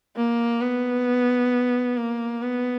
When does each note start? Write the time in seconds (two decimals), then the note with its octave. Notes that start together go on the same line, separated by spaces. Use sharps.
0.17 A#3
0.61 B3
1.97 A#3
2.43 B3